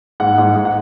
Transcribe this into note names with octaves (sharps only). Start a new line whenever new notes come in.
G#2 F#5
G#2
G#2
F#5